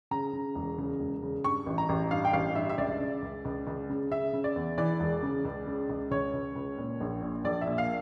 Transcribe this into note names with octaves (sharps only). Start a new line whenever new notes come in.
C#3 A#5
C#3
E1
C#3
E1
C#3
G2 C#6
A1
A#5
A1
G2 F5
G5
A1 F5
G2 E5
E5
C#2 D5
C#3
C#2
C#2
C#2
C#3
C#3 E5
C#3
D5
E2
E3 D5
E1
C#3
C#2
C#3
C#2
C#2 C#5
C#2
C#2
A#2
A#1
A#2
A#1 D5
E5
A#2
F5